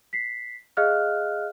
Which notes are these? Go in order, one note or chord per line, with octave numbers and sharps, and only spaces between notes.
B6 C7
G#4 D#5 F5 F6 F#6